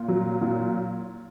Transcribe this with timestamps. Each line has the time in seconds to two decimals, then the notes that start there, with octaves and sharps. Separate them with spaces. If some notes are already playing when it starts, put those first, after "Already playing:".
Already playing: A#2
0.08 F#3
0.41 A#2